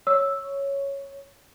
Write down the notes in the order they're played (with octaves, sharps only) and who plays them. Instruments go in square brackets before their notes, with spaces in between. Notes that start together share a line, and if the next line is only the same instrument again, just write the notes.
[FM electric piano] C#5 [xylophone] E6